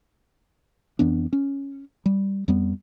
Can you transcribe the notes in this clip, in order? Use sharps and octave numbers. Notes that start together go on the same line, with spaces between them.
F2 E3 B3 D4
C#4
G3
F2 G3 B3